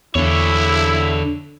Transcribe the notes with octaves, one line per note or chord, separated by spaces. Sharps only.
E2 D3 E4 C#5